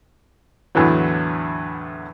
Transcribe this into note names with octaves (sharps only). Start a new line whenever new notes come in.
E2 A2 D3 E3 F#3